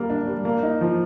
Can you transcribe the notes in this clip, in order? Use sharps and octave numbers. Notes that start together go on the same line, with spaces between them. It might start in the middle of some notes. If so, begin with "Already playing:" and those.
Already playing: G3 A#3
D4
G3
A#3
D#4
F3